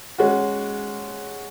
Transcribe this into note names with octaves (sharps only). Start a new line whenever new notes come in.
G#3 C#4 F#4